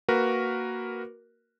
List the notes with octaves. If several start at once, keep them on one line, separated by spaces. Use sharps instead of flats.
A#3 F#4 A#4 B4